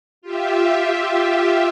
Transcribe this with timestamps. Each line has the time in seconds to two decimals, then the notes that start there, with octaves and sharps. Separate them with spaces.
0.22 F4 G4 E5